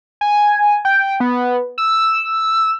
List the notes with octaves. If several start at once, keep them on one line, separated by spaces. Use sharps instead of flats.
G#5
G5
B3
E6